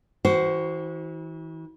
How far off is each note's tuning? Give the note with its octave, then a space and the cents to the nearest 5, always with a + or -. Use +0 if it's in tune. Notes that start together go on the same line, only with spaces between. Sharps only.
E3 -35 F#4 +15 C5 +0